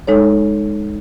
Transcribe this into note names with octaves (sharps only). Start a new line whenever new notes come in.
G#3 D#4 A4 C#5